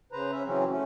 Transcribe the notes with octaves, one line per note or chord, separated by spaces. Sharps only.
C#3 B4 C5 A#5
C#4 E5
C#3 E3 F#3 C4 C#4
A3 C#4